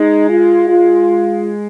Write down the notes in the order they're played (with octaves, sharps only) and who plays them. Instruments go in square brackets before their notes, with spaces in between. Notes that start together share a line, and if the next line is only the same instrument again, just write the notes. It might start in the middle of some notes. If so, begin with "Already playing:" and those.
Already playing: [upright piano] G#3 [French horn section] D#4
[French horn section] F4
F4